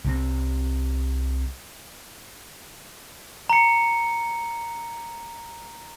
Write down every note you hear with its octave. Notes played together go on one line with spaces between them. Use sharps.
C2 C3 C4
A#5 C#7